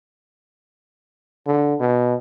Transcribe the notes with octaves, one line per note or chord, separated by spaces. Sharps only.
D3
B2